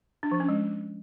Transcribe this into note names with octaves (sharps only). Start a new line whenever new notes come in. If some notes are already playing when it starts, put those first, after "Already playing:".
D4
F3
C#4
G#3